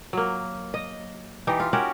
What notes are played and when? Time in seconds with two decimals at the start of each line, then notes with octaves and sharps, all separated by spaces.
0.13 F#3 A#3
0.74 D#5
1.47 E3 D#4 G4
1.60 F4
1.73 C#4 F#4 G4 A#4